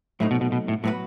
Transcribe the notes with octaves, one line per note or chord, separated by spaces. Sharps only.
A2 F#3 A3 C4 D#4
B2
B2
B2
A2
A2 F#3 B3 F#4 B4